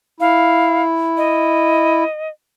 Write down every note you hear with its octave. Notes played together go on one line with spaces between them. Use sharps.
E4 F5
D#5